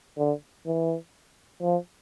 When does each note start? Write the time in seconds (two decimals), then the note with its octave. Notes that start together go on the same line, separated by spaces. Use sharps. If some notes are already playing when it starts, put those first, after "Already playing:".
0.18 D3
0.66 E3
1.62 F3